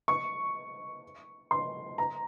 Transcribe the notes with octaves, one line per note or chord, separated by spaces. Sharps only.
C#6
C6
A#5